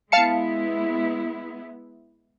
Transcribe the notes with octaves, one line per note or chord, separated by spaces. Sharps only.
G#3 B3 E4 F5 A5 C#7